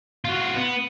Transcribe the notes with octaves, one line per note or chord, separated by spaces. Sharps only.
F4 F#4
B3